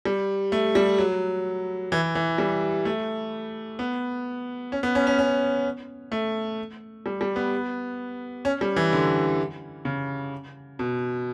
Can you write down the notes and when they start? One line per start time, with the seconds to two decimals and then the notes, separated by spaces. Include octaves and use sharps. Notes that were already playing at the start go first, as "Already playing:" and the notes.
0.05 G3
0.52 A3
0.75 G3
0.98 F#3
1.92 E3
2.15 E3
2.38 G3
2.85 A3
3.79 B3
4.72 C#4
4.83 B3
4.95 C#4
5.07 C#4
5.18 C#4
6.12 A3
7.06 G3
7.21 G3
7.36 B3
8.45 C#4
8.61 G3
8.76 E3
8.93 D3
9.85 C#3
10.79 B2